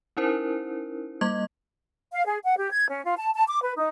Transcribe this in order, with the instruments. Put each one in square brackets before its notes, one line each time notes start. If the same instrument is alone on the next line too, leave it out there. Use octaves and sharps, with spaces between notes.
[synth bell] C#4 D#4 E4 A#4 C5
G3 A#3 D#5 D6 G#6
[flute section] F5
G#4
F#5
G4
G#6
C#4
F4
A5
A5
D6
B4
D#4